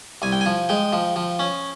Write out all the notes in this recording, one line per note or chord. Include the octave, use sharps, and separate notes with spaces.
C2 G#5
G5
G#5
F3
G#3 G5
F3
F3
C#4